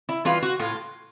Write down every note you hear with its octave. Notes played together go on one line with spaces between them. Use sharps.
E4
E3 G3 F4
F#4
A2 F4